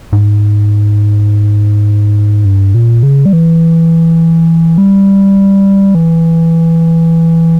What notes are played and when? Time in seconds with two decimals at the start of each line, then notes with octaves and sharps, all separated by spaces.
0.13 G#2
2.45 G2
2.75 A#2
3.03 C#3
3.26 G3
3.33 E3
4.78 G3
5.95 E3